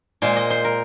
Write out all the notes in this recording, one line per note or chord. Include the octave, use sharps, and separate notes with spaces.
A#2 G#3 C5
D#5
C5
A#4